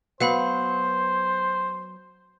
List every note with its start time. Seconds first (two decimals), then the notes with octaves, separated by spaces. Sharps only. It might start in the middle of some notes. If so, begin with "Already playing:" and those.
0.20 F#3 B3 C5 F5 F#5 B5